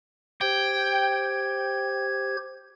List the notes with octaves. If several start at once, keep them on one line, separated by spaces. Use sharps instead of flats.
G4 C5 G5 G#6